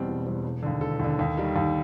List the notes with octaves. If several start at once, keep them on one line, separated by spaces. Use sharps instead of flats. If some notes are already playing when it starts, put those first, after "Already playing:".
Already playing: E2 B2 G3 C4
E1
E2 B2 G3 C4
E1
D#2 D3
E1 A4
D#2 D3
D#2
D#3 G3
D#2